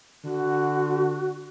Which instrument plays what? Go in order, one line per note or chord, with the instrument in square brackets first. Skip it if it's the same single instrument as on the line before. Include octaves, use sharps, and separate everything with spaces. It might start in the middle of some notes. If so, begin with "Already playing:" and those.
[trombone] D3 [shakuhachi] F#4